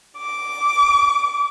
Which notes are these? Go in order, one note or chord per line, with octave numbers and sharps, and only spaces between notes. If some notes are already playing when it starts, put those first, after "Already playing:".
D6